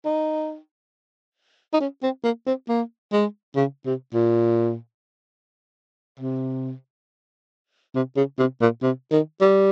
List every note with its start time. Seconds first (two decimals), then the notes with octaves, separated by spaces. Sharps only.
0.05 D#4
1.74 D#4
1.80 C#4
2.03 C4
2.24 A#3
2.47 C4
2.69 A#3
3.12 G#3
3.56 C#3
3.86 C3
4.14 A#2
6.20 C3
7.95 C3
8.17 C#3
8.39 C3
8.61 A#2
8.82 C3
9.12 D#3
9.41 G3